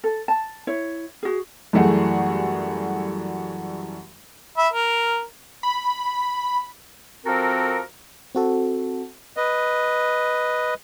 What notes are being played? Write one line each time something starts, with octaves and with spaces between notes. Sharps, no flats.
A4
A5
E4 C#5
F#4 G#4
F#2 E3 G3 A3 F#4 G#4
E5 B5
A#4
B5
F3 C4 F#4 A4 A#4
C4 F#4 A4
B4 D#5